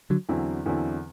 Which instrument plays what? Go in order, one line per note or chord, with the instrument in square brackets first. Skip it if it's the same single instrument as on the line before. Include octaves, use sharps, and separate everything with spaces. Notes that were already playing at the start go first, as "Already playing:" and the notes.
[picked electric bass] D3 F#3
[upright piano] E2 D3 F#3 C4 E4
E2 D3 F#3 C4 E4